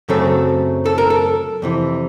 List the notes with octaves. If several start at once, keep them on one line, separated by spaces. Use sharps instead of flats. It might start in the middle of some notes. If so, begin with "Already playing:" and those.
F#2 C#3 F#3 A3 C4 A4
A4
A#4
A4
F2 C3 E3